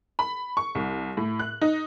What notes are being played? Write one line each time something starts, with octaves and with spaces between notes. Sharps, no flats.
B5
C#6
C2
A2
F#6
D#4